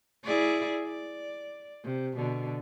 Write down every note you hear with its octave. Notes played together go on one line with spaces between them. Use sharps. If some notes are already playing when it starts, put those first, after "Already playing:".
E4 G#4 D5
D5
C3
B2 D3